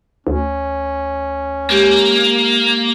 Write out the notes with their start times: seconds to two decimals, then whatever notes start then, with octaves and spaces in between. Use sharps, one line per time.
0.27 D2 C#4
1.70 G#3 A#3 G4